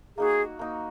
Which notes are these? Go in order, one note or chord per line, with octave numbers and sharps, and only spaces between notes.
A#3 D#4 F#4 G#4
A#3 D#4 F#4